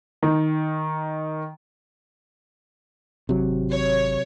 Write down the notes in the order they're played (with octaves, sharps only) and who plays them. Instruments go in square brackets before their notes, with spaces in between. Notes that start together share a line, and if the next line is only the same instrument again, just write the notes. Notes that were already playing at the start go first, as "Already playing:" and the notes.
[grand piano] D#3
[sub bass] G#1 [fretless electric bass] C3 F#3
[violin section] C#5